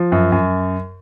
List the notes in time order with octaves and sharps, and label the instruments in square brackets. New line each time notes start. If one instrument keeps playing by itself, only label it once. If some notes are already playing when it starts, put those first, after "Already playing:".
Already playing: [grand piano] F3
F#2
F#2